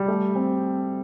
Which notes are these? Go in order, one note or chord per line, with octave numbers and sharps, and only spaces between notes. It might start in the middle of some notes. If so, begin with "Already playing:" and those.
Already playing: G3
A3
C4